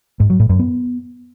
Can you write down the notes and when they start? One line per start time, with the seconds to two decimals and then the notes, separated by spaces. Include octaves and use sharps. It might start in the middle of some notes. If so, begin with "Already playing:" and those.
0.20 G#2
0.30 F#3
0.40 A2
0.49 F#2
0.59 B3